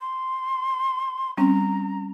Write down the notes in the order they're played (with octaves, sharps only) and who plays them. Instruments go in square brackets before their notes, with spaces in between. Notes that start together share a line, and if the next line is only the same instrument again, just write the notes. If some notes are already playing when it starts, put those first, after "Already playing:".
[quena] C6
[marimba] G3 C4 C#4 [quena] A#5